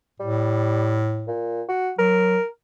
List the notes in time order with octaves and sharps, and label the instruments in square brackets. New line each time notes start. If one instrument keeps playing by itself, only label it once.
[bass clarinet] A2 [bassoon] G3
[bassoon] A#2
F#4
[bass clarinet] F#3 [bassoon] A#4